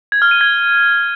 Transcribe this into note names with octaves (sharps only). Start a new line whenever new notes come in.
G#6
F6
D#7
G#6